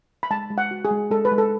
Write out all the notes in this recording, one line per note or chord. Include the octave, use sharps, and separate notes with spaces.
B5
G#3 A5
G#3
F#5
F#4
G#4
G#3
G#3 A4
B4
G#3
A4